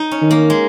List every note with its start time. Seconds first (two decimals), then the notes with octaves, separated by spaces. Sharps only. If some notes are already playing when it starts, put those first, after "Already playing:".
Already playing: D#4
0.11 C#4
0.21 D#3
0.31 A#3
0.50 G#3